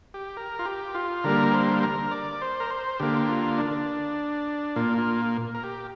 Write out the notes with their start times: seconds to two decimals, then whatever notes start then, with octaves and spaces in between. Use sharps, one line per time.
0.14 G4
0.37 A#4
0.59 F4
0.65 G4
0.95 F4
1.24 D3 G3 A#3 A#4
1.53 C5
1.83 A#4
2.11 D5
2.42 C5
2.60 A#4
2.71 C5
3.00 D3 A#3 G4
3.29 F4
3.58 D4
4.76 A#2 A#3 F4
4.98 F4
5.55 A#4
5.64 G4